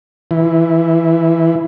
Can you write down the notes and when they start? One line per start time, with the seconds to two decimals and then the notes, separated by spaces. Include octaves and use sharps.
0.31 E3